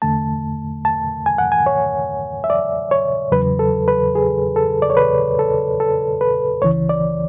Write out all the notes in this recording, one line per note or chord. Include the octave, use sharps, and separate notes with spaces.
E2 D3 A3 A5
A5
G#5
F#5
G#5
C#5
E5
D5
C#5
E2 C#3 F#3 B4
A4
B4
G#4
A4
D5
C#5
B4
A4
A4
B4
C#2 C#3 E3 C#5
D5